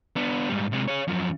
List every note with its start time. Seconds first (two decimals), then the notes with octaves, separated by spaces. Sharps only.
0.16 B3 D4
0.49 G#2 G3
0.72 C3 G#3
0.88 G#4 C#5
1.08 F#2 F3